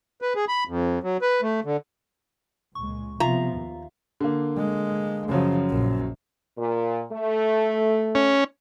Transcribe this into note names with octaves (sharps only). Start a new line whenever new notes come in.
B4
G#4
B5
F2
F#3
B4
A3
D3
C#2 A#2 G#3 C#6
C3 F3 B3 F4 E5 F5 A#5
D#2
D3 A#3
G#3
F#2 C#3 F3 F#3
A#1 A#2
A#2
A3
C#4